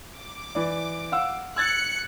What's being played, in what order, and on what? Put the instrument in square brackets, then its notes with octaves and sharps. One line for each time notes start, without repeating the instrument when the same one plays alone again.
[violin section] D6
[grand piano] E3 D5
F5 F#5 E6
[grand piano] E6 G#6 A6 [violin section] F#6 C#7